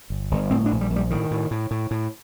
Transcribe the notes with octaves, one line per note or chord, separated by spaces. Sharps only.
G1
G1
A2 C4
D4
A#1
G3
A#1
G3
A2 D#3
A2
A2
A2
A2